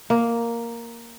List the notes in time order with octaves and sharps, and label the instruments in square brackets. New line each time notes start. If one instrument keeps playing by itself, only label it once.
[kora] A#3